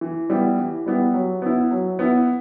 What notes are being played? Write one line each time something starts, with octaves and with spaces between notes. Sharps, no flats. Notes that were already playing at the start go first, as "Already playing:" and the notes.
E3
G3 B3 E4
E3
G3 B3 E4
F#3
B3 E4
F#3
B3 E4